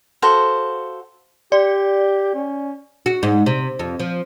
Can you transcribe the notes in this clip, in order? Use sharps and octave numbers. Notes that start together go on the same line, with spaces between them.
F#4 A4 C5 F5
G4 D5
C#4
F#4
G#2
C3
F2
F3